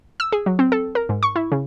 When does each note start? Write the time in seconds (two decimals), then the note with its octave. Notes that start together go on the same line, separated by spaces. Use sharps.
0.20 E6
0.32 G#4
0.46 F#3
0.59 C4
0.72 A4
0.95 A#4
1.09 G#2
1.23 C#6
1.36 E4
1.52 C#3